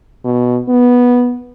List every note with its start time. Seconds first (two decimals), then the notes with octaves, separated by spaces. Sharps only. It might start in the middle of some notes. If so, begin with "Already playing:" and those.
0.24 B2
0.69 B3